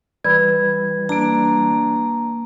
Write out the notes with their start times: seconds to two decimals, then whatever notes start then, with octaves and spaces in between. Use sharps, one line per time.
0.25 E3 G3 B4 B5 G#6
1.09 A#3 D4 A#5